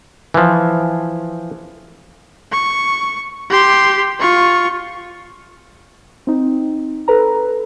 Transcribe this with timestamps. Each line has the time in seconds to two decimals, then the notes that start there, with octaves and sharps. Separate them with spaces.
0.34 E3 F3
2.52 C#6
3.50 G4 C6
4.19 F4 C#6
6.27 C4 D#4
7.08 A4 B4 A#5